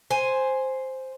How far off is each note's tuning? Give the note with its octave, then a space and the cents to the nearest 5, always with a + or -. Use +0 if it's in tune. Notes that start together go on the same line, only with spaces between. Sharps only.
C5 +0 G#5 +0